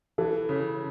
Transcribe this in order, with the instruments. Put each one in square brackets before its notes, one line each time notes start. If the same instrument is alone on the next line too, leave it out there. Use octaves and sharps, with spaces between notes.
[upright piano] E3 [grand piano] A4
[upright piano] C#3